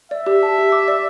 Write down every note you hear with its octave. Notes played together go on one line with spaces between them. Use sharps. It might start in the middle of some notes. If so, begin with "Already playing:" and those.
D5 E5
G4
A5
G4
D6
D5